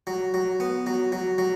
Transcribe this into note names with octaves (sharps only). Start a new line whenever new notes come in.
F#3
F#3
B3
F#3
F#3
F#3